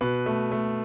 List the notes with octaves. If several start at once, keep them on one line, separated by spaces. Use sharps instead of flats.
B2 B4
A3
A3